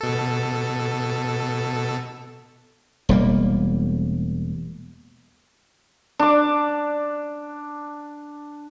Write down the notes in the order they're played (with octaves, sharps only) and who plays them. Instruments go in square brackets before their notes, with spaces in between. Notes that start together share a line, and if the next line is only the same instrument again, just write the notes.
[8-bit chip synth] B2 A4
[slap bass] E1 G3 A#3
[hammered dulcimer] D4 D6